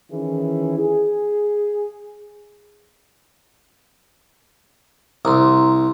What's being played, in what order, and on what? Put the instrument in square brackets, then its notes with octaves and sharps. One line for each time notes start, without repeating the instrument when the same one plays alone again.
[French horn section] D#3 E3 C#4 E4 G#4
G#4
[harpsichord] C2 [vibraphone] A#5 C6